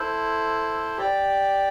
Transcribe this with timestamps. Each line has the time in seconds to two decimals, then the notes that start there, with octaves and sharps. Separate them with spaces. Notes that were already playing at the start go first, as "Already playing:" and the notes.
Already playing: E4 A4 C5
0.97 G4 D5 G5